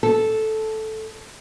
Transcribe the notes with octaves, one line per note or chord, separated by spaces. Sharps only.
A4